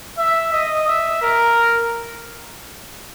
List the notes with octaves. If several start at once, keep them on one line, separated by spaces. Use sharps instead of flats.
E5
D#5
E5
A#4